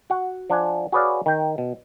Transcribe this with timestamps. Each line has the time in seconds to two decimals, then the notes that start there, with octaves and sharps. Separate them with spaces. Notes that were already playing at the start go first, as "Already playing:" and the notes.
0.10 F#4 F#5
0.50 F3 D4 F#5 G#5
0.92 F#4 G#4 B4 C#5 D5 F5
1.26 D#3 G5
1.58 B2